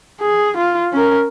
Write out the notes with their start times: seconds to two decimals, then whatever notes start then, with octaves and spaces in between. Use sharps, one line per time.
0.21 G#4
0.57 F4
0.93 C#4 A#4